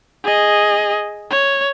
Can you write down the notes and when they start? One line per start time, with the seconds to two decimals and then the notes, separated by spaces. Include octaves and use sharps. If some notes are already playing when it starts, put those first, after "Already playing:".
0.24 G#4 D#5
1.30 C#5